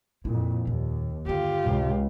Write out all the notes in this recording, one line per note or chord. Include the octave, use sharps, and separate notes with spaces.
F2 A#2 E4 F4
D#2 A#2
G2 D3 F4 G4
C#2 A2 C3